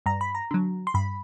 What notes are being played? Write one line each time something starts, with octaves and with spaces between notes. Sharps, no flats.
G2 A#5
B5
A#5
D3 F#3
C6
G2 B5